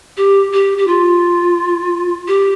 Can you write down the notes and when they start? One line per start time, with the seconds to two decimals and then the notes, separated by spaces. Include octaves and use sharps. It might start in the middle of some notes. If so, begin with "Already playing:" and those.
0.17 G4
0.52 G4
0.78 G4
0.87 F4
2.28 G4